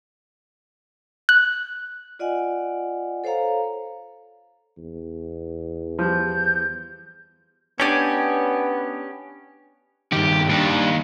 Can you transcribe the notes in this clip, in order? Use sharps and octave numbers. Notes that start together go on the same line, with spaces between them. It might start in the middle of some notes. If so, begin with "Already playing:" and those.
F#6
F4 D5 D#5 F#5 G#5
A4 C5 C#5 F5 A#5
E2
F3 G3 G6
B3 C#4 D4 G4 C#5 D5 G#5
G2 D#3 G4
D#2 G3 D4